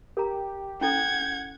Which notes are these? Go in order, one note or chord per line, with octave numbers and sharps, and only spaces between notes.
G4 A#4 A#5
C#4 E4 A4 F#5 G6 G#6